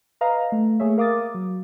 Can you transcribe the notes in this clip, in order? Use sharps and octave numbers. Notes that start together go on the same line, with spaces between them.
B4 D#5 F5 A#5
A3
A3 A#3 G#4 C#5 E5
A#4 F5 D6 D#6 A6
F#3